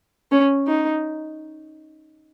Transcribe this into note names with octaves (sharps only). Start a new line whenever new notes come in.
C#4
D#4